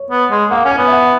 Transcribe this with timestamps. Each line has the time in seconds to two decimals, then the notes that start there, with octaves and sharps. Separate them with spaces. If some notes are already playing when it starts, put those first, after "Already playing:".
Already playing: C#5
0.11 B3
0.31 G#3
0.51 A#3 F#5
0.65 C#4
0.71 G#5
0.78 B3
0.88 E5
0.93 F#5